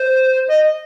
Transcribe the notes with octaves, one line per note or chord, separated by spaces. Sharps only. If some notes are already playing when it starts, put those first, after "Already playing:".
Already playing: C5
D#5